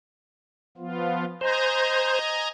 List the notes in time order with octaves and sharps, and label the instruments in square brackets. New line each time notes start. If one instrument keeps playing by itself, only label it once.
[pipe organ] F3 B3 F4
[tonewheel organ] C5 [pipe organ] D#5 G#5 A#5